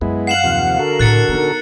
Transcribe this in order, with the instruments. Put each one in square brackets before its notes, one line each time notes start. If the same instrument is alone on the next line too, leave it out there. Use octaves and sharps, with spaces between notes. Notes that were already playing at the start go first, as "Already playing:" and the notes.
[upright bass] F#2 [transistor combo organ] G#3 B3 E4
[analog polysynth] F5 F#5 [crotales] C7 E7 F#7
[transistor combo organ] D#2 C3 F3
[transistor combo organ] D3 F#4 A4 [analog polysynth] A#4
[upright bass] A2 C#3 [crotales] F#6 A6 C#7
[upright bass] B3 D#4